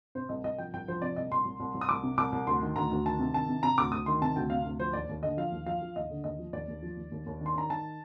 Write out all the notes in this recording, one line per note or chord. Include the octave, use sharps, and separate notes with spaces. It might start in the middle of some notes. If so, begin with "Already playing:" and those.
C3 C5
C2 D#5
C2 D#5
F3 G5
C2 G5
F3 C5
C3 D5
C2 D#5
C2 C6
C2
C2
C2
D#6
C2 D6
C3
C2 D6
C2
D2 C6
D#3
D2 A#5
D2
D#3 A5
C3
D#3 A5
C3
C3 A#5
D2 D6
D2 D#6
D#3 C6
C3 A5
D2 G5
C3 F5
D2
F3 C5
D#2 D5
D#2
D3 D#5
F3 F5
D#2
F3 F5
F3
D#2 D#5
D3
D#2 D#5
F3
D#2 D5
D#2
F3
D#2
D#2
D#2
D#3 C6
D#3 A#5
D#3 A5